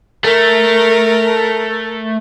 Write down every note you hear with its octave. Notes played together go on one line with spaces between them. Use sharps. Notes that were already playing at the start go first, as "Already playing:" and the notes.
A3 A#4